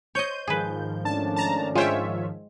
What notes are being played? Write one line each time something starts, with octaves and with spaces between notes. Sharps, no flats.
C5 C#5 D#5 G6 D#7
G#2 D#3 F3 G#4 B4
A3 C#4 D4 A5
A5 A#5
G#3 F4 C5 C#5 E5 G5